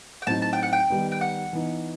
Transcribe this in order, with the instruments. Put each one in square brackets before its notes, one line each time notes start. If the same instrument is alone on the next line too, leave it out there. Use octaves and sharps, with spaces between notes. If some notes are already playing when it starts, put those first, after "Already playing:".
[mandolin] G5
[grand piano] A2 F#3 C4 D#4 F#4 [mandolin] A5
[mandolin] A5
G5
F#5
G5
[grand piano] D#3 G3 B3 D#4
[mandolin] G5
F#5
[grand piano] E3 B3 D#4